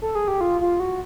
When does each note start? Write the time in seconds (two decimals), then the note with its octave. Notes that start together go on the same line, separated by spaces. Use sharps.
0.02 A4
0.15 G#4
0.28 G4
0.41 F4
0.61 F4
0.80 F#4